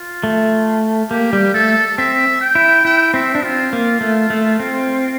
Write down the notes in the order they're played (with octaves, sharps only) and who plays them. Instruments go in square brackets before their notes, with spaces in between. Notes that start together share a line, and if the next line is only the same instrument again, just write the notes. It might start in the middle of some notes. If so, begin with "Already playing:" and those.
Already playing: [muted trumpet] F4
[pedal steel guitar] A3
[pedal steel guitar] A#3 [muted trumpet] G4
[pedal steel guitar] G3
[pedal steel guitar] A3 [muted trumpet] A4
[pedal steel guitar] C4 [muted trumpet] E5
[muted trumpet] G5
[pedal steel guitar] E4
[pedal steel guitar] E4 [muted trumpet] G5
[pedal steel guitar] C4 [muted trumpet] E5
[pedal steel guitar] D4
[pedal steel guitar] C4 [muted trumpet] F4
[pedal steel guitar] A#3
A3
A3
C4